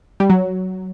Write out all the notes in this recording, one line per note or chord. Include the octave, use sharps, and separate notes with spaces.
G3
F#3